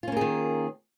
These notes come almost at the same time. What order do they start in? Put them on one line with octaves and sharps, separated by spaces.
F4 C#4 A#3 G#4 D#3